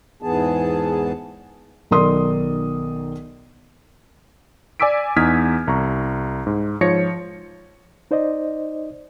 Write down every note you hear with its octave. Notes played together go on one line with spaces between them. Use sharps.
E2 G#2 E3 B3 G#4 A5
B1 D#3 A#4 D5 C6 D#6
D5 G#5 D6 E6 B6 D7
E2 D#4 D#6 F6 G#6 B6
C2 A#5 C#6
G#2
G#2 F3 C#5 A#6 C#7
D#4 C5 D5 D#5